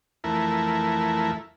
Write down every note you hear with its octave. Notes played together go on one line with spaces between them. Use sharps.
F2 E3 A3 E4 A#4